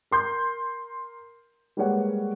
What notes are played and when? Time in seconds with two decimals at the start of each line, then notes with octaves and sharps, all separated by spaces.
0.11 A#4 C6 G6
1.77 G3 G#3 A#3 B4 C#5 F#5